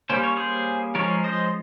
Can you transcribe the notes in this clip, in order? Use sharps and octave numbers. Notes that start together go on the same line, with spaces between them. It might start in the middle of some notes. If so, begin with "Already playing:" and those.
G3 A#3 C#4 C5
C#5
G#4 C5
F3 G#3 C#4 A#4 C#5
C5 D#5